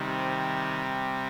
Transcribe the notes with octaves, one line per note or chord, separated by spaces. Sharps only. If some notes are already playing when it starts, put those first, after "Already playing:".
Already playing: C3 D#3 G3
C4